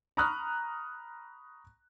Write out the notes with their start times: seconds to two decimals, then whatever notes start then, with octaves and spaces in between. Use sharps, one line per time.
0.17 A#5 B5 C#6 D#6 F6 F#6